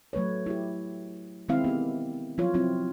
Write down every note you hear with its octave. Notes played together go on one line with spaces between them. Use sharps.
F#3 A3 B4 C#5
E4 G4
D#3 G#3 C4 E4 F5
B3 G4
F3 F#3 F4 C#5
F#3 C4 E4 F4